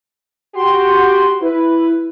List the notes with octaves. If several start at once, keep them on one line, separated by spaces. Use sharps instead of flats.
F#4 G4 C6
E4 B4